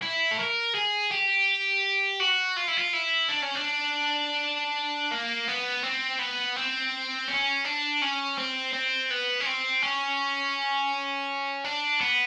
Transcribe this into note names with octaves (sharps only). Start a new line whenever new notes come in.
E4
A4
A#4
G#4
G4
F#4
F4
E4
F4
E4
D4
C#4
D4
A#3
B3
C4
B3
C4
C#4
D4
C#4
C4
C4
B3
C#4
C4
C#4
D4
B3